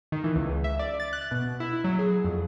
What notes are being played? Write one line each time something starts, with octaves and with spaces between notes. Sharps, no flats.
D#3
E3
C#2
E5
D5
A6
F#6
B2
E4
F#3
G#4
F2